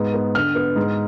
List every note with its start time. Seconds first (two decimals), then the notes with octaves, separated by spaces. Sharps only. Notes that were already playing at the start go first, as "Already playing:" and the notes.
Already playing: G#2 B3
0.14 B3
0.35 D3 F6
0.55 B3
0.76 G#2